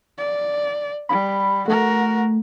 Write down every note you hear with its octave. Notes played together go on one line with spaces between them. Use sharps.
D5
G3 B5
A3 F#4 A#4